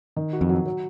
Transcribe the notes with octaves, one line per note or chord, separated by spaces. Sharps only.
D#3
F#4
F2
F#3
F#3